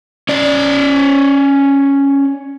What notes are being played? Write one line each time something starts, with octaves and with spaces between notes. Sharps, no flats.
C#4 D5